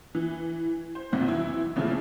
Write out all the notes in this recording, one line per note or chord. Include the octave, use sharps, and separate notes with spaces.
E3
C5
B1 F2 C3 D#3
E3 E4
A#2 C#3 E3 F3 A3 E4